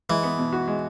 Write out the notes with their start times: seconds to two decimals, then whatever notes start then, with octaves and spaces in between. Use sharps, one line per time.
0.09 E3 G#3
0.23 B3
0.39 B2
0.53 F#4
0.68 G#3